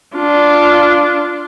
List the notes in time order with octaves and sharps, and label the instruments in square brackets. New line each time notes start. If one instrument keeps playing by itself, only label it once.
[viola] D4 F4